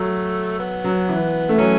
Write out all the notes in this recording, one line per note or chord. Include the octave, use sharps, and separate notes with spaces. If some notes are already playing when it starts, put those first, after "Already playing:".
Already playing: F#3 A3
B3
F#3
E3
A3
F#3 C#4